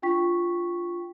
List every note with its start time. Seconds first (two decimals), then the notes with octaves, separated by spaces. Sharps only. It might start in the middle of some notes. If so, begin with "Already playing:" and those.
0.02 D4 F4 G5 C#6 B6